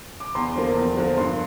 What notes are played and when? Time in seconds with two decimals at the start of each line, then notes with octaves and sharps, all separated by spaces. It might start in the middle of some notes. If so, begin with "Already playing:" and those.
0.20 D6
0.35 E2 C6
0.55 D3 F3 A#3
0.77 E2
0.97 D3 F3 A#3
1.17 G2 C6